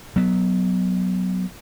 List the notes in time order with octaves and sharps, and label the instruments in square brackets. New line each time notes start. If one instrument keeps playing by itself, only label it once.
[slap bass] F#3 B3